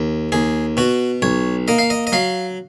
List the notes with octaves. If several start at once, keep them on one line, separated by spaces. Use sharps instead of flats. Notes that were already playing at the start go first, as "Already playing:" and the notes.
Already playing: D#2
D#2 G#4
B2 F#4
B1 C#5
A#3 D#5
F5
D#5
D#5
F#3 F5